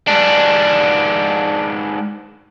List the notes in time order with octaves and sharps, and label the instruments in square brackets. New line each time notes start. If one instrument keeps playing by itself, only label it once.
[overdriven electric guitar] G#2 D4